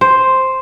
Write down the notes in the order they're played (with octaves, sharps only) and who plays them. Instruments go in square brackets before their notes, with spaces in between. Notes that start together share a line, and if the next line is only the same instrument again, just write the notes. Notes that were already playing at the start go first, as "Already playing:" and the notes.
[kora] C5